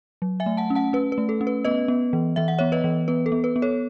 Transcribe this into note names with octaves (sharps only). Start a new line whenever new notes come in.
F#3
E5 G#5
A3
F#5 A5
C#4
F#5 A5
C#4 B4
B4
A3
A4
C#4
B4
B3 B4 D#5
B3
E3
E3 E5
F#5
B3 C#5 E5
B4 D#5
E3
B3 B4
A4
B3
B4
B3
A4 C#5